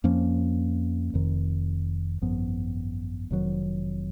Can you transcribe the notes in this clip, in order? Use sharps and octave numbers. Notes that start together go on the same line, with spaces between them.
F2 F3 A#3 C#4
F1 F2 D#3
G#1 F#2 F3 B3
F1 F2 D#3 F#3